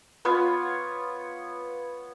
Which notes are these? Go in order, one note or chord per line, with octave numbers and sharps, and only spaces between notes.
B3 F4 C#5